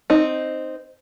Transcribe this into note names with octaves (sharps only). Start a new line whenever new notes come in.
C4 D#4